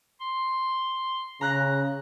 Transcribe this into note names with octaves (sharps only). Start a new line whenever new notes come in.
C6
C#3 A#5 F#6 A#6